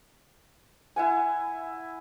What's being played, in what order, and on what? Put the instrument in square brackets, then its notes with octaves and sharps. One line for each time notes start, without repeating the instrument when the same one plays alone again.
[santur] E4 F#5 G#5